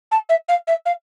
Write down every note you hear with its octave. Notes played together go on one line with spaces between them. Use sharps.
A5
E5
F5
E5
F5